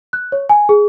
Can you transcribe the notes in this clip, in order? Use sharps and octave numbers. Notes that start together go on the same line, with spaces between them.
F#6
C#5
G#5
G#4